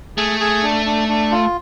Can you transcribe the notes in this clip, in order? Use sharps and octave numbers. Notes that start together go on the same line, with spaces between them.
A3 G#4
G#4
D4
D4
D4
F4